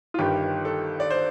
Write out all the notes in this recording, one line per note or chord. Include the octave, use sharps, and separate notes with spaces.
F4
G1 G2 D#3 G4
A4
D5
C5